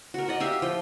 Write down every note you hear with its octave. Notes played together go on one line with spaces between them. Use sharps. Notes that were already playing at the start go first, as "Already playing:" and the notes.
F#4 A#4
F#4 D5 D#5
G4 E5 F5
F3 G5